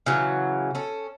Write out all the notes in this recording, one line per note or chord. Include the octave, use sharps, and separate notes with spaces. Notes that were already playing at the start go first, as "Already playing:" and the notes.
C#3 E3 F#3
C#4 A4